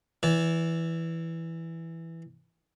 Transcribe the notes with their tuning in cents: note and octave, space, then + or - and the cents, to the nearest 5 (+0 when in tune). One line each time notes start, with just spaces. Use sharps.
E3 +0 D5 -30